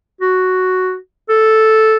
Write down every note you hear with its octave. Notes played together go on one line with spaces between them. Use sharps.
F#4
A4